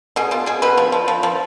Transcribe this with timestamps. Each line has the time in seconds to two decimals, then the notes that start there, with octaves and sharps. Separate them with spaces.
0.16 B2 G#4
0.31 B2 F4
0.46 B2 G#4
0.62 B2 B4
0.77 F3
0.92 F3
1.08 F3
1.23 F3